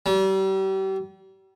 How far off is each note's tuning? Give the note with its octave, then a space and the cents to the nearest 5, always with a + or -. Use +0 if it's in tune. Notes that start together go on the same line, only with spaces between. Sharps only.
G3 -35